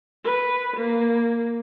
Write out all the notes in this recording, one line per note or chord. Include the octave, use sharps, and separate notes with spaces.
B4
A#3